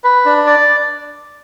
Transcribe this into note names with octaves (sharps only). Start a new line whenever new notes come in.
B4
D4
D5